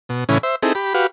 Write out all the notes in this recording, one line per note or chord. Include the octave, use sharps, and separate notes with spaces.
B2
A2 C#3 E3 C#4
C5 E5
C4 D#4 E4 G#4 A4
G4 B5
F#4 G4 B4 F5